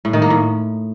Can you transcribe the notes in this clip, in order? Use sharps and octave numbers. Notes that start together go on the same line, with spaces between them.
A2
D#3
A#3
A2